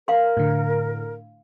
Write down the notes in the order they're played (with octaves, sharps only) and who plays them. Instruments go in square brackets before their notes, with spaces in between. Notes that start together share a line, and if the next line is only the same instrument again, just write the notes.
[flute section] A#4 [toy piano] F5 C6
[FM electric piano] A2 D3